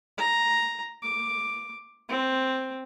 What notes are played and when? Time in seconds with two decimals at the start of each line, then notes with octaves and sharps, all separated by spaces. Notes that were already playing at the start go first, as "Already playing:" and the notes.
0.18 A#5
1.03 D6
2.09 C4